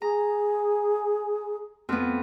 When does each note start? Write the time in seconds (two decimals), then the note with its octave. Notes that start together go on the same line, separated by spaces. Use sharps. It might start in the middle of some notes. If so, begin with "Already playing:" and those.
0.02 G#4 A#5
1.89 F2 B3